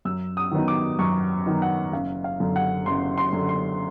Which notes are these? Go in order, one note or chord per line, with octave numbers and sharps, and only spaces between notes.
F#2 E6
D#6
D#3 F#3 B3 D#4
D6
F#2 C#6
D#3 F#3 B3 D#4
F#5
F#1 F5
F5
F#2 D3
F#5
F#1 C6
C6
F#2 D3
C6